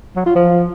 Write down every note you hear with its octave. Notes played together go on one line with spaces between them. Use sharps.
F#3
F4
F3